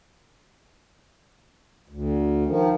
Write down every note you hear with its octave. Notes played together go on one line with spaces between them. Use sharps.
D2
D#3 F3